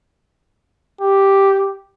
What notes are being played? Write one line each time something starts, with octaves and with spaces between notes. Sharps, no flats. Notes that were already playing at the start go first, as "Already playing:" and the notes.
G4